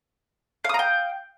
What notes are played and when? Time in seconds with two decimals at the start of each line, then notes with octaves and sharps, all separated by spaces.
0.65 F5
0.69 D#6
0.74 A#5
0.79 G5